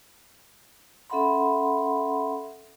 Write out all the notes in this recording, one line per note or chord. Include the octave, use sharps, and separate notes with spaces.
C#4 A4 E5 F#5 B5 C6